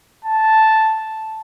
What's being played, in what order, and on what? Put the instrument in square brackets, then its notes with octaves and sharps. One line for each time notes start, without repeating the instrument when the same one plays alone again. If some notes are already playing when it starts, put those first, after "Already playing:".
[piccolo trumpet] A5